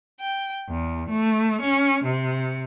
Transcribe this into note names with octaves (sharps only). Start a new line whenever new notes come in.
G5
E2
A3
C#4
C3